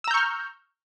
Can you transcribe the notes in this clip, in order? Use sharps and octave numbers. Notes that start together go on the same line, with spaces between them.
A#5 C#6 E6 F6 G6